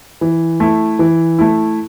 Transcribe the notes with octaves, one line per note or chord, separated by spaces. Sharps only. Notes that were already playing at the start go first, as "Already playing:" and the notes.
E3
A3 E4
E3
A3 E4